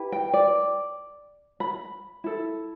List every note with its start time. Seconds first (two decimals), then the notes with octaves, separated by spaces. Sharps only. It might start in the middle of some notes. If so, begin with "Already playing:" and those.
Already playing: E4 G4 B4
0.12 G5
0.33 D5
1.60 B5
2.24 E4 A4